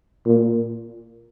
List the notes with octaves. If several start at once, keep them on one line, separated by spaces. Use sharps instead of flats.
A#2